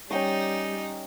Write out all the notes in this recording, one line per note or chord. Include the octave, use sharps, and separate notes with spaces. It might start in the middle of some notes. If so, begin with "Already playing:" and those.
G3 C#4 D#4 G5 C#6